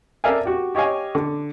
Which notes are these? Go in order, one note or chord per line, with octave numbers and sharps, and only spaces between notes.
A4 A#4 D5 E5 F5 G#5
F#4 G4
G4 C#5 D#5 F5 G#5
D3